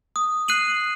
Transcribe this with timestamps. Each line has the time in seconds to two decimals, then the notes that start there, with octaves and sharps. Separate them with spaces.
0.16 D#6
0.48 F#6 C7 D#7 F#7